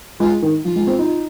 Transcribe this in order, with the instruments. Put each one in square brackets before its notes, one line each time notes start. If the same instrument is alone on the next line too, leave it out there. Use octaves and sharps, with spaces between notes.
[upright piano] G#3 [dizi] F4
[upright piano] D#3
[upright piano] F3 [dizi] F4
[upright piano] G#3
C4
D#4